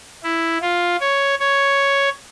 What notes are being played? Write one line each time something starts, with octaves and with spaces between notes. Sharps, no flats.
E4
F4
C#5
C#5